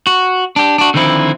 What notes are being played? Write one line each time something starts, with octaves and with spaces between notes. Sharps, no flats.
F#4
D4 G4
D4 F#4
D3 D#3 F3 C4 E4